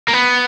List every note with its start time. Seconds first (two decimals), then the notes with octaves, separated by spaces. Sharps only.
0.08 A#3
0.13 B3